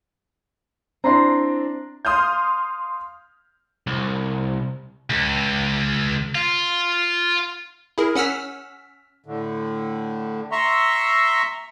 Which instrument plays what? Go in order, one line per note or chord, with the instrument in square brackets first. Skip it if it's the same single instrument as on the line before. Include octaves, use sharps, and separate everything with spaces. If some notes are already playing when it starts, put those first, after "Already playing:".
[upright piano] C4 D4 E4 [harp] A#5 C6
[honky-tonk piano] F5 C6 D#6 F6 G6
[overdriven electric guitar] C2
[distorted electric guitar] C#2
F4
[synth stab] E4 G#4 A#4
C#4 F#5 E6 F6 B6
[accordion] A2 D3
E5 A#5 C6 C#6 E6